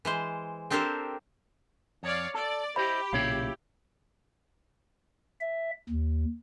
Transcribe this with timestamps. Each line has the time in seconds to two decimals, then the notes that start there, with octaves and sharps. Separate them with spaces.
0.05 E3 G#3 C5
0.70 C4 D4 G4 A4 A#4 C5
2.03 F2 C#5 D5 F5
2.35 A4 D5
2.76 E4 G4 C5 D#5 B5
3.13 B1 A#2 C#3 E4 C#5 F5
5.41 E5
5.89 D#2